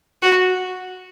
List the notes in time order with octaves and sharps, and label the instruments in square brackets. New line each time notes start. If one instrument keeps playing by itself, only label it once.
[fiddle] F#4